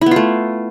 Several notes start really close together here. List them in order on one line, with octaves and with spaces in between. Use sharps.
E4 B3 F4 A3